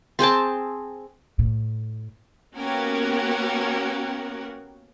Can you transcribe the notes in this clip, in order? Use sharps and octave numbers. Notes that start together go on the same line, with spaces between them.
C4 G#4 G5 A5
A2
A#3 B3 C#4 F#4 G4 A#4